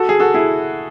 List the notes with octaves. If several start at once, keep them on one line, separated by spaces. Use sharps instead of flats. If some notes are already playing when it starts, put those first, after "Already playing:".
Already playing: F#4 A4
G#4
F#4 A4
E4 G#4